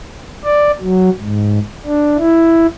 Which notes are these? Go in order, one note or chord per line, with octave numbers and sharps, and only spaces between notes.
D5
F#3
G#2
D4
E4